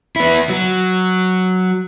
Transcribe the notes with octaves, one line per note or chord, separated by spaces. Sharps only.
B3 E4
F#3